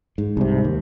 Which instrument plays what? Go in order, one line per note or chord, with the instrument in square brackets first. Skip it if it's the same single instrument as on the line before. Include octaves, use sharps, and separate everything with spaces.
[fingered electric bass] G#2
[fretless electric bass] C2 C3
D#2